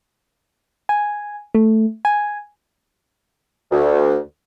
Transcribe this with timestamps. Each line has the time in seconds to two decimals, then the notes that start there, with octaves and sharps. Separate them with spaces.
0.89 G#5
1.55 A3
2.05 G#5
3.72 D2